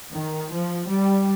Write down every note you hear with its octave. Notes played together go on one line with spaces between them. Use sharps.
D#3
F3
G3